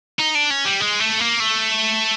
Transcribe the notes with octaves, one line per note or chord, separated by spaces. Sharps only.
D#4
D4
C#4
G3
G#3
A3
A#3
A3